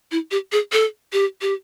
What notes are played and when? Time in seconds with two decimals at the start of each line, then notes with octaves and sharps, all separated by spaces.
0.11 E4
0.31 G4
0.52 G#4
0.72 A4
1.13 G4
1.41 G4